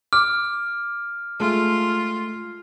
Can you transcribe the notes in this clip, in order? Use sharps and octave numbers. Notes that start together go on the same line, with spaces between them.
D6 F6
G#3 A3 F4